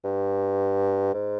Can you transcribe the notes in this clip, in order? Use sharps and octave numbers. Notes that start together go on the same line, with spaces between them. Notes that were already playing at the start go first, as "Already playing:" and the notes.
G2
G#2